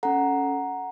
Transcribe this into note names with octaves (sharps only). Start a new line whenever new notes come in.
C#4 A4 F#5 A#5